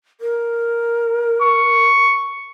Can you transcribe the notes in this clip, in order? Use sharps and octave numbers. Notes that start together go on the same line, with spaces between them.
A#4
C#6